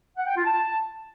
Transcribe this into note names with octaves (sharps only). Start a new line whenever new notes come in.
F#5
G5
F4
A5